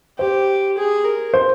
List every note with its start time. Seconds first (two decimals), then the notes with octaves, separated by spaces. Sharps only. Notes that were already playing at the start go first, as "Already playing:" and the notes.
0.18 G4 C5
0.77 G#4
1.05 A#4
1.34 C5